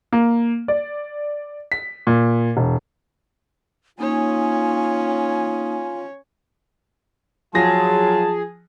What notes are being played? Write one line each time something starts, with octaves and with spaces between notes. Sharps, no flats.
A#3
D5
B6
A#2
E1
A#3 C#4 D#4 F4 C#5 G#5 D#6
F3 F#3 F4 G#4 A5 A#6